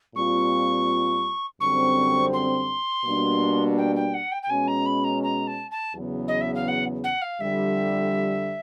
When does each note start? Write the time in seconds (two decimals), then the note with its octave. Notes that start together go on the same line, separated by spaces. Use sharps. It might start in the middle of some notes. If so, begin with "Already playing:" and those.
0.16 A#2 G3 C4 F4 C#6
1.61 F#2 D3 G3 C4 C#6
2.33 C6
3.05 B2 G3 A#3 D4
3.78 G5
3.96 G5
4.14 F#5
4.32 G5
4.43 G5
4.50 B2 G#3 C#4 G#5
4.68 A#5
4.86 B5
5.04 A#5
5.23 A#5
5.47 A5
5.71 A5
5.95 E2 C#3 F#3 B3
6.28 D#5
6.41 E5
6.55 F5
6.68 F#5
7.04 F#5
7.22 F5
7.40 F2 D3 G3 E5